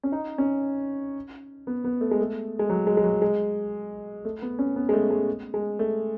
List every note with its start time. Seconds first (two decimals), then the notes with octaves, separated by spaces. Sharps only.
0.03 C#4
0.12 D#4
0.38 C#4
1.67 B3
1.84 B3
2.01 A3
2.11 G#3
2.21 A3
2.59 G#3
2.70 F#3
2.87 G#3
2.97 G#3
3.04 F#3
3.22 G#3
4.25 A3
4.42 B3
4.59 C#4
4.76 B3
4.89 G#3
4.93 A3
5.10 G#3
5.54 G#3
5.79 A3